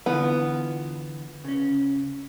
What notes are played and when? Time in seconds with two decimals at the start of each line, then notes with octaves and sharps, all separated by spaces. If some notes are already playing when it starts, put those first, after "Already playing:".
0.06 D3 E3 B3 F4
1.44 C#3 C#4